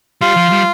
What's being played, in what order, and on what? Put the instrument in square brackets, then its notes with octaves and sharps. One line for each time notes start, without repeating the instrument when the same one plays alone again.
[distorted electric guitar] G3 [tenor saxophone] F4
[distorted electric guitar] F3
G3